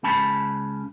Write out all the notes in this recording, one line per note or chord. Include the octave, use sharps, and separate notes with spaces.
C#2 C#3 C#4 A5 B5